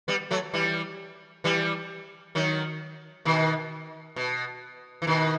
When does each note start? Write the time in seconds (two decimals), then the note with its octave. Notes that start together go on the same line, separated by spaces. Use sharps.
0.08 G3 B3
0.31 F#3 A3
0.54 E3 G3
1.44 E3 G3
2.35 D#3 F#3
3.25 B2 D#3
4.16 B2
5.02 E3
5.07 B2 D#3